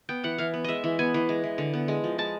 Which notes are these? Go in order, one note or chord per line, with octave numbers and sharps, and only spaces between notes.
B3 G5
E3 F#5
E3 F5
B3
G#3 D#5 E5
E3
B3 G#5
E3
G#3
E3
D3
B3
G#3
F3
G#3 A5